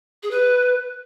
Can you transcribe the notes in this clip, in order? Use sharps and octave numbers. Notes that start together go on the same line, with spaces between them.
G#4
B4